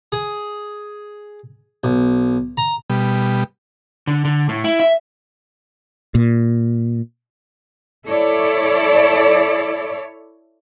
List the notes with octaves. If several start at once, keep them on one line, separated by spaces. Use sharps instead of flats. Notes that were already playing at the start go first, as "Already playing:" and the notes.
G#4
B1
A#5
B2 G3
D3
D3
A2
E4
E5
A#2
E4 A4 C#5 D5